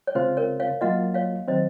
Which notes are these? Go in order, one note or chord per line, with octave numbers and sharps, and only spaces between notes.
C#5
C#3 G#3 C4 F4 C5
A#4 C#5
C#5 F5
F#3 A#3 F4 D#5 F#5
C#5 F5
D#3 F#3 C4 C5 D#5